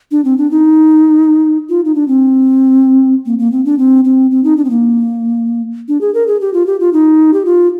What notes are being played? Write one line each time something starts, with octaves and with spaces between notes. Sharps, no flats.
D4
C4
D4
D#4
F4
D#4
D4
C4
A#3
A#3
C4
D4
C4
C4
C4
D#4
D4
C4
A#3
D4
G#4
A#4
G#4
G4
F4
G4
F4
D#4
G4
F4